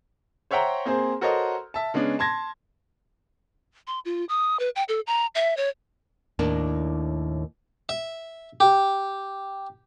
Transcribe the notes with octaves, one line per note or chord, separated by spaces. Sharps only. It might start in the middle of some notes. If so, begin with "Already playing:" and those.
C5 C#5 E5 F#5 G5 A#5
A#3 C4 G#4 C5
F#4 A4 A#4 C5 C#5 D#5
E5 A5
C#3 G#3 B3 C#4 D4
A5 C6 G#6 A#6
C6
F4
D#6
B4
G5
A4
A#5
E5
C#5
D#2 A2 A#3 D4
E5
G4